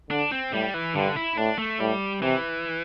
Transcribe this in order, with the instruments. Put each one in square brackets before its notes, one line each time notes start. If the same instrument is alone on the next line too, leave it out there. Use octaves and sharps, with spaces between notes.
[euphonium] D3 [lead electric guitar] D4
[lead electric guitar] C4
[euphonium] A2 [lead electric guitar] G3
[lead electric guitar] E3
[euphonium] G2 [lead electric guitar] D3
[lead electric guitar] E4
[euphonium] A2 [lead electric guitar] D4
[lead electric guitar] A3
[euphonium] A2 [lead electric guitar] G3
[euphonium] C3 [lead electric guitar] E3